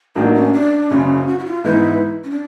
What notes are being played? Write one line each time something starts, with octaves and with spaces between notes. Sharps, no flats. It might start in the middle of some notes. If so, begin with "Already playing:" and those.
A1 A2 F#3 A#3 D4 D#4
C#4
D4
F#1 F#2 C#3 C#4
F#4
E4
F4
G#2 E3 G#3 B3 D#4 E4
C#4
D4